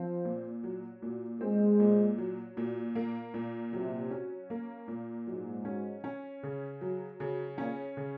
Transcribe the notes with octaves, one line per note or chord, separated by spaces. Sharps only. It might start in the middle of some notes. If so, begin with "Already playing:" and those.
Already playing: F3 C4
A#2
F#3
A#2
G#3 C4
A#2
F#3
A#2
A#3
A#2
C3 F#3
C#4
A#3
A#2
G#2 F#3
C#4
C#4
C#3
F#3
C#3
A#2 C#4
C#3